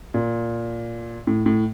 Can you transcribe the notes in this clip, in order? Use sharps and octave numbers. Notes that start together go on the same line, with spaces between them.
A#2
A2
A2